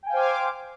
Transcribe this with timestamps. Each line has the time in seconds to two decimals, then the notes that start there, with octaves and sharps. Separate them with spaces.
0.03 G5
0.06 G#5
0.10 F5
0.13 C5
0.16 D6